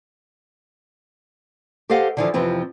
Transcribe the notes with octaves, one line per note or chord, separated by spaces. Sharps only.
G4 A4 C5 D#5 F5 F#5
D3 E3 F3
F2 C3 E3 F3 C4